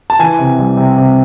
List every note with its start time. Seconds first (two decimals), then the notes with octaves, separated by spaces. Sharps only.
0.10 A5
0.19 E3 G#5
0.39 C3
0.59 G3
0.77 C3
0.98 C3